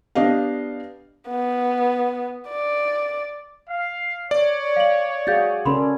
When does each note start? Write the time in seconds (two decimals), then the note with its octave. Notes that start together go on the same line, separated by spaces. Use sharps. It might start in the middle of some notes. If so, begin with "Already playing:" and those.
0.15 B3 D4 G4 D#5 F5
1.28 B3
2.48 D5
3.69 F5
4.31 C#5 D5
4.76 F5 F#7
5.27 F#4 G#4 F5 G6 A6
5.65 C#3 C#4 A4 A#4 B5 C6